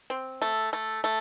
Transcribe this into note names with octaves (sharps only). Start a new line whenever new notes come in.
C4
A3
A3
A3